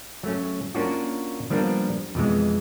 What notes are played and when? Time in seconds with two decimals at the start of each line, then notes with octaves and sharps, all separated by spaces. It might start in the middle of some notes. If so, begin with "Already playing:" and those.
0.23 F#3 A3 C#4
0.75 A#3 C#4 D4 F4 F#4
1.50 F3 G3 A#3 B3 D4
2.15 F2 B2 E3 G#3